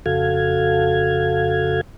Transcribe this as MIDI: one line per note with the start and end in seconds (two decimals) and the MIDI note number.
0.06 1.81 41
0.06 1.81 49
0.06 1.81 66
0.06 1.81 69
0.06 1.81 77
0.06 1.81 92